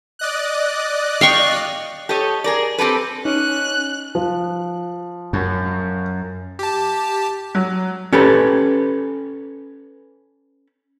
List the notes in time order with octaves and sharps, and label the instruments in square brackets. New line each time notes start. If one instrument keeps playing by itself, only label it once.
[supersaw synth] D5 D#5 F#6
[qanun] F5 G5 C#6
[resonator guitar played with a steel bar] G4 A4 C#5 D#5
G#4 A#4 D5
C4 G4 A4 B4
[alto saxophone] C#4 [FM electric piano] D#4 [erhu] F#6
[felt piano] F3
[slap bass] F#2
[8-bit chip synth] G4 A5
[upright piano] F#3
[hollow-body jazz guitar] C#4 G4 A4 B4